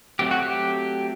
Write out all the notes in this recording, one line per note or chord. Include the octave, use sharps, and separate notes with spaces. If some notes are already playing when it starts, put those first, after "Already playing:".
F#3 A3 C4 G4
F#4
G4